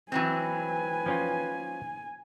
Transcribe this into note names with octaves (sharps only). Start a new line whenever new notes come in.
E3 F#3 C4 B4 G#5
F3 C#4 F4